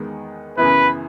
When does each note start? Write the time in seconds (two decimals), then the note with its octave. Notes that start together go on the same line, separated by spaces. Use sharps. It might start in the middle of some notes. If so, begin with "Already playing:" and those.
Already playing: E2 D#3 G#3 B3
0.58 F#2 C#3 E3 B3 E4 B4